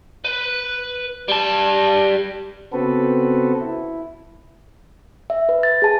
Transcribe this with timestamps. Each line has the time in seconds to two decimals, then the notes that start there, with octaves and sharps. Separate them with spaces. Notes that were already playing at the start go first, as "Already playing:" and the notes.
0.25 B4
1.28 G3 A5
2.73 C#3 B3 C4 F#4 A4 B4
3.62 E4
5.30 E5
5.49 B4
5.63 A6
5.82 G#4 A5